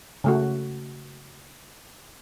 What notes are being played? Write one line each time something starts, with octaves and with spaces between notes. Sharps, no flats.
C#3 A3 F#4